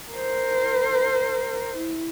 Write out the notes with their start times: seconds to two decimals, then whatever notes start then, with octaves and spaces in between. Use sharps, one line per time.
0.11 A#4 C5
1.76 E4